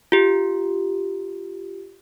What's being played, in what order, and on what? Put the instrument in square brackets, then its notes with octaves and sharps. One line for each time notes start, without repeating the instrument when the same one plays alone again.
[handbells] F4 G4